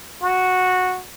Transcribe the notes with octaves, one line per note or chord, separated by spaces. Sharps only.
F#4